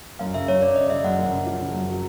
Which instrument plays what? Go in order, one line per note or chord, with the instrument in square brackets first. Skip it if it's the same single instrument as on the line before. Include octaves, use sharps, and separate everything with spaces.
[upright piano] F#2 [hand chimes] F5
[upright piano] C#3 [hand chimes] E5
[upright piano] F#2 [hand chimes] C#5
[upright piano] C#3 [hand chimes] D5
[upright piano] C#3 [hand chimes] D#5
[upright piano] C#3 [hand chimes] E5
[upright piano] F#2 [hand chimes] F#5
[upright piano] F#2
C#3
F3
C#3
F#2
F#3